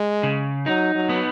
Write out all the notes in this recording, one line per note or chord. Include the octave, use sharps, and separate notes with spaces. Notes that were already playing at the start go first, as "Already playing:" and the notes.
Already playing: G#3
C#3
F#3 D#4
F#3
B3